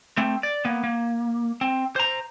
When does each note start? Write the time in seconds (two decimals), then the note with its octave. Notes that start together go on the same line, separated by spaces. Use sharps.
0.17 A3 C4
0.43 D5
0.65 A#3 B3
0.84 A#3
1.61 C4
1.96 C5 A#5